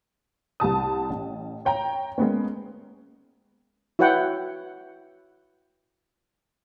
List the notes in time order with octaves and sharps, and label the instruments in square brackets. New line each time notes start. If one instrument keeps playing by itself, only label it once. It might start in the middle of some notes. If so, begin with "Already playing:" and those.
[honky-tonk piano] C2 G4 A5 D#6
A1
C#5 G5 A#5
G#3 A#3 B3 C#4
[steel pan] E4 F#4 B4 C#5 F#5 G5